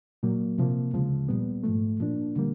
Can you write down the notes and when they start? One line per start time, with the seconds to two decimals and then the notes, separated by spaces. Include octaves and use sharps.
0.23 A#2 F#3 A#3
0.58 C3 F3 A#3
0.94 D2 C#3 F3 G#3
1.29 A#2 G3 B3
1.64 G#2 F3 A3
2.00 A#2 F3 A#3 D4
2.36 D3 G3 A#3